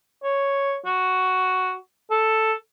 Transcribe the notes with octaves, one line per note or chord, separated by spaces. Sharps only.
C#5
F#4
A4